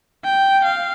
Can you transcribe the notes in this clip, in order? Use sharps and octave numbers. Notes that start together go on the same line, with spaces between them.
G5
F5